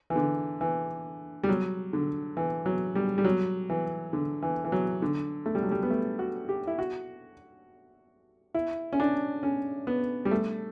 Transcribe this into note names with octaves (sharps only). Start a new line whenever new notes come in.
E3
D3
E3
G3
F#3
D3
E3
F#3
G3
G3
F#3
E3
D3
E3
E3
F#3
D3
A3
G3
F#3
G3
B3
A3
F#4
G4
E4
F#4
E4
C#4
D4
C#4
B3
G3
A3